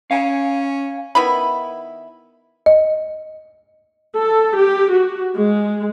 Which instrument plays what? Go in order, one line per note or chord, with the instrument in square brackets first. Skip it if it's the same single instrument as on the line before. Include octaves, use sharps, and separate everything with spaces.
[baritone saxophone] C#4 [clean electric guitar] F5 G#5
[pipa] D#3 B3 E4 B5
[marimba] D#5
[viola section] A4
G4
F#4
G#3